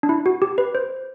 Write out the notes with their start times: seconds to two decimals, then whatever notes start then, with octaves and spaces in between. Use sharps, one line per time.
0.03 D4
0.09 E4
0.26 F#4
0.42 G4
0.58 B4
0.75 C5